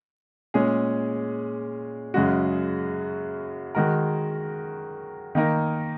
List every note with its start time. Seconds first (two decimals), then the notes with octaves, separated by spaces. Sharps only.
0.54 A#2 G#3 C#4 G#4
2.14 F#2 C#3 G#3 F#4
3.75 D#3 G#3 F#4 A#4
5.35 D#3 A#3 D#4 A#4